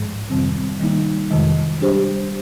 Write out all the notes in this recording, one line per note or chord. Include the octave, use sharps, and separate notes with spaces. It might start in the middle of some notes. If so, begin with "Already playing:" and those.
Already playing: G#2 F3 G#3
F2 C3 D#3 G3 C4
D#3 G3 A#3 D#4
F2 C3 D#3 G#3
G3 D4 G4 C5